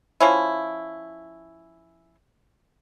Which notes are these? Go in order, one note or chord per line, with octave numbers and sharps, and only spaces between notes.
F3 C#4 E4